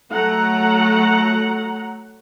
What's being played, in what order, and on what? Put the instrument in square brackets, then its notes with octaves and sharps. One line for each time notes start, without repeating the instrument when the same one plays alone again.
[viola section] F#3 A3 F#5 A#5